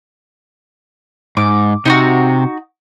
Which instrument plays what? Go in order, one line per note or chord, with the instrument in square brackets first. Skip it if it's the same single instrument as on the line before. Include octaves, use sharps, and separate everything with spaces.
[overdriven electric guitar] G#2 [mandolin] D6
[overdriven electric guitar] C3 [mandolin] D#4 E4 F#4